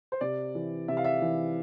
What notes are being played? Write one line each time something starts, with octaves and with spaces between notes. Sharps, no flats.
C5
C3 D5
E3
C3 E5
F5
E5
E3